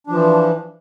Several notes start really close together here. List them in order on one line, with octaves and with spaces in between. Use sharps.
D4 F3 E3